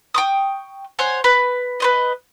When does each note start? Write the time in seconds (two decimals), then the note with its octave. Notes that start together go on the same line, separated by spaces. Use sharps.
0.14 G5 C#6 D#6
0.99 C5 C#5 F#5 G#5
1.24 B4
1.80 B4 C5 D#5